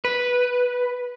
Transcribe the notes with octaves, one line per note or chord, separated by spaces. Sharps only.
B4